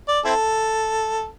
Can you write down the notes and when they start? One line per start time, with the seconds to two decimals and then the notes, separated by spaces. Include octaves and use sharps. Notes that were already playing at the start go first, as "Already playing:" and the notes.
0.08 D5
0.25 C4 E4 A4